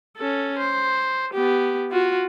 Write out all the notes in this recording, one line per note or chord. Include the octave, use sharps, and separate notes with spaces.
C#4 A4
C5
B3 G4
F4 F#4